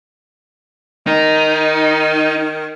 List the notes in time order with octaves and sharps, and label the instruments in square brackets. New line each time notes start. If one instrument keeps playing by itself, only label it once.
[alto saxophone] D#3 [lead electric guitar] D#4